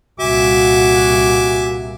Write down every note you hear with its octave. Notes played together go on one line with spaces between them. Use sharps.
C2 A#2 F#4 E5 G#5 D6